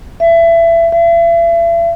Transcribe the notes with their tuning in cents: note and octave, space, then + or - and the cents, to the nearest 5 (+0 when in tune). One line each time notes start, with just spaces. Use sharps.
E5 +25
E5 +40